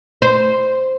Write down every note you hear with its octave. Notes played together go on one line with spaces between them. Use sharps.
C5